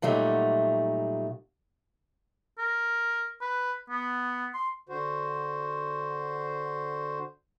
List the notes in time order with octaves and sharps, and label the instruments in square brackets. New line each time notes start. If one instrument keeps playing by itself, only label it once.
[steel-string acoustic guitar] A#2 F#3 G3 A3 D#4
[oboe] A#4
B4
B3
C6
[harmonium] D3 F#4 C5